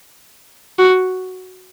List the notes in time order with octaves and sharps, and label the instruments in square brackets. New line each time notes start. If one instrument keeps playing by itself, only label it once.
[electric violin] F#4